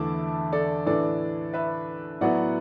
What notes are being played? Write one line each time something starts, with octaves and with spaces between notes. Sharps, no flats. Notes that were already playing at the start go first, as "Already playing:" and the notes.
Already playing: E2 D3 A3 E4 A5 D6
A4 D5
A2 E3 D4 A4 D5
B4 E5
A2 F#3 B3 E4 D5 F#5